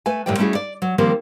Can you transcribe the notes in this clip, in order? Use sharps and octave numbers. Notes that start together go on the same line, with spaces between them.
A3 B4 G#5
F#2 A2 D3 G3 D5 G5
G3 A3 C#4 E4 F#4 G#4
D5
F#3
D#3 F3 G3 A#3 C4